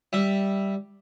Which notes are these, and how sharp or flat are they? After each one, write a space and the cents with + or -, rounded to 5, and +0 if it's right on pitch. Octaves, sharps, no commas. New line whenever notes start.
G3 +0 E5 +0